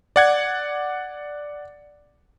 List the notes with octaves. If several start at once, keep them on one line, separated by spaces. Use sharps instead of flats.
D5 F#5 G#6